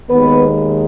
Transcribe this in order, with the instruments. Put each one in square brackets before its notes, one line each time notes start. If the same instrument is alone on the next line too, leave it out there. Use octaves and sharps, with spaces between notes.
[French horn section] D#2 D#3 G#3 B3 B4